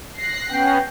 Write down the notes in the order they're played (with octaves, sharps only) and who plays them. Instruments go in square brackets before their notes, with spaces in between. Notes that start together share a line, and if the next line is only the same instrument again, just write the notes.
[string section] F#6 A#6 C7
[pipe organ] B3 C#4 [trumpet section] G5